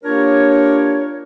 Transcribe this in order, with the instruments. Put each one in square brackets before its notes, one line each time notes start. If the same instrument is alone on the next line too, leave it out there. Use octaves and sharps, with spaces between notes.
[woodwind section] A#3 D4 F4 G4 A#4 C#5